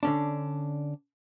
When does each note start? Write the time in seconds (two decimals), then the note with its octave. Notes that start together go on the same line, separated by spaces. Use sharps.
0.03 D3 C#4 D4